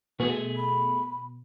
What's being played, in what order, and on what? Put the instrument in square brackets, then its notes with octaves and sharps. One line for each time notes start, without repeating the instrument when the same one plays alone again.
[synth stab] B2 [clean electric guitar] A3 G#4
[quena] B5